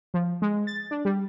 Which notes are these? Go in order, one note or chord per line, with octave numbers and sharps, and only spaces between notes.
F3
G#3
A6
D4
G3